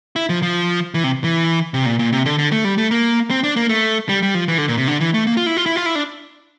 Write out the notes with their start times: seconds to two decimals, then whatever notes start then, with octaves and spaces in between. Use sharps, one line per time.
0.16 E4
0.29 F3
0.42 F3
0.94 E3
1.04 C3
1.24 E3
1.74 C3
1.86 A#2
1.99 A#2
2.13 C3
2.26 D3
2.39 D3
2.52 A3
2.65 G3
2.78 A3
2.91 A#3
3.30 C4
3.44 D4
3.56 A#3
3.69 A3
4.09 G3
4.22 G3
4.35 F3
4.48 E3
4.58 D3
4.68 A#2
4.78 C3
4.88 D3
5.01 E3
5.14 A3
5.27 A#3
5.37 F4
5.46 E4
5.57 F4
5.66 E4
5.76 F4
5.86 E4
5.95 D4